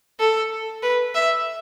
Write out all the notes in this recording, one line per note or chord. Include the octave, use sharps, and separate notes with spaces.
A4
B4
E5